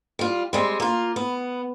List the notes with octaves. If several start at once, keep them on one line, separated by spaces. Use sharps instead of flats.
G3 F4
G3 G#3 C4
A#3 F4
B3